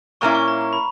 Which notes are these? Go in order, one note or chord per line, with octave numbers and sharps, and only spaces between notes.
A#2 A#3 C#4 E4 C#6
C#6
A#5
A#5
B5